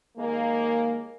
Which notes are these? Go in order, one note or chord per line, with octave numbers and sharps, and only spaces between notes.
D#2 G#3 A#3